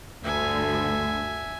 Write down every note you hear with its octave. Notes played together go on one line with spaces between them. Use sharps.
D2 G2 D3 E5 G#5